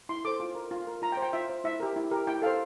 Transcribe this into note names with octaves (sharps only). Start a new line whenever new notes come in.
E4 C6
A4 C5 D6
F4
A#4
F4
A#4
F4 A#5
G5
C5
G5
F4 E5
C5
E4 E5
G4 A#4
E4
G4 A#4
E4 G5
A4 C5 F5